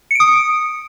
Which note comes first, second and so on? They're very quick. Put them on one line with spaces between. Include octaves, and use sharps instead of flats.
C#7 D7 D#6